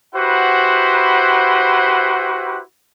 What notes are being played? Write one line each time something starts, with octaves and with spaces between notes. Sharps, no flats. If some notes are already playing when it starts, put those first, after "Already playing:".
E4 F#4 G4 B4 C5 F#5